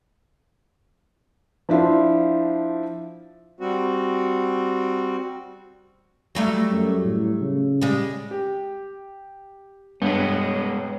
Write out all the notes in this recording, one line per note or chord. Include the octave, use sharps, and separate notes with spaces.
F3 D4 E4 F4 C5
G3 C4 F#4
F#3 G3 A3
F#2
A2
C#3
G3 G#3
G4
G2 G#3 B3 C#5